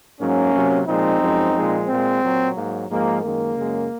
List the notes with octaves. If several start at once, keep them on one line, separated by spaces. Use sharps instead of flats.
G#2 F#3 A#3 C#4
C3 F#3
A#2 F3 G#3 C4 D#4
F#2 F3 G#3
A#2 F3 G#3
A#2 G#3 C4
A#2 F#3
G#2 F#3 A#3
G#2 F3 G#3 A#3
F#2 D#3 G#3 A#3
F#2 C#3 G#3